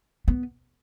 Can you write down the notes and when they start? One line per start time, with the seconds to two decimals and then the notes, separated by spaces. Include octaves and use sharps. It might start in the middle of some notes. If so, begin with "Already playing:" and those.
0.28 B3